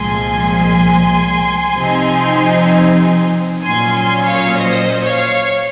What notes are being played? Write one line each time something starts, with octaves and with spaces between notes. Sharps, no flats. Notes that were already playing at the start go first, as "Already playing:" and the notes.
Already playing: C2 A#2 F3 G#3 G#5 C6
C3 F3 C4 D#4
A#2 F#3 C#4 G#5 C6
G#5 C6
C#5 F5
C5 D#5
C#5 F5